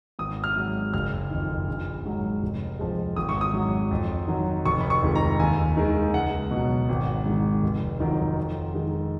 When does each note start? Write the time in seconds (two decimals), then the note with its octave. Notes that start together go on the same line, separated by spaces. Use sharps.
0.19 G#1 D#6
0.44 F6
0.56 G#2 F#3
0.94 F#1 F6
1.31 F2 D#3
1.67 A#1
2.05 G#2 F#3
2.43 F1
2.79 F2 F3 G#3
3.16 G#1 D#6
3.29 C#6
3.41 D#6
3.54 G#2 F#3
3.91 F2
4.28 D#3 F#3
4.65 F1 C#6
4.81 B5
4.90 C#6
5.03 F2 D#3 G#3
5.15 A#5
5.39 D#2 G#5
5.77 D#3 G#3
6.14 C#2 F#5
6.51 B2 F#3
6.89 G#1
7.26 G#2 D#3
7.63 F1
8.00 F2 D#3 F#3
8.37 F2
8.74 D#3 G#3